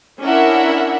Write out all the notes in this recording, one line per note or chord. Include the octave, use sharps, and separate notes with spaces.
C#4 D4 E4 A#4 E5 F#5